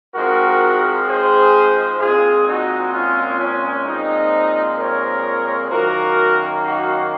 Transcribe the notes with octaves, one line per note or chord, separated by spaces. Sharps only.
G#2 F3 G#3 C4 F#4 A#4
G#4 C5
A#2 G#3 C4 F4 G#4
D#4 F#4
C#4 F4
C#4
A#2 F3 G#3 C4 D#4
A#4 C#5
F#2 D#3 A#3 F#4 A#4
D#4 F#4